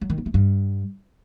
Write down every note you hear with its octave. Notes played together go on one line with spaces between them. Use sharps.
F#3
D#3
B3
A3
G2